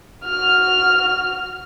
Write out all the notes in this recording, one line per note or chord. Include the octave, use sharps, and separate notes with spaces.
F#4 F6